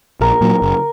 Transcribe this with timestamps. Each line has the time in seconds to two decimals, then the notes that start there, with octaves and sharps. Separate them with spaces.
0.21 A#1 A#4
0.41 A#2 F#3
0.62 F#1